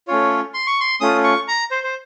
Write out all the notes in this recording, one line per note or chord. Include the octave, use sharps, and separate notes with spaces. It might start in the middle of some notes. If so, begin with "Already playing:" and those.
A3 C#4 F4 C#5
C6
C#6
C6
A3 C#4 F4 D#6
C#6
A#5
C5
C5